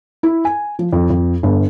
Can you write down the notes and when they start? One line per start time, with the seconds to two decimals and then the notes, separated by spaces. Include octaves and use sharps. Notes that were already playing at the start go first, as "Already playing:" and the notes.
0.23 E4
0.45 G#5
0.79 F3
0.93 F2
1.10 F2
1.43 G1